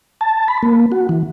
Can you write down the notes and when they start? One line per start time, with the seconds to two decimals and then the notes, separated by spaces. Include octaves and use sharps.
0.21 A5
0.48 B5
0.63 A#3
0.92 F#4
1.09 E3